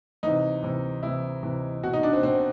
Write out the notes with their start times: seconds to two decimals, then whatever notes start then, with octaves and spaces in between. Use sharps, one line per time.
0.23 C3 E3 D#4
0.63 C3 E3
1.03 C3 E3 E4
1.43 C3 E3
1.83 B2 F#4
1.93 D#4
2.03 D4
2.13 C4
2.23 B2 C4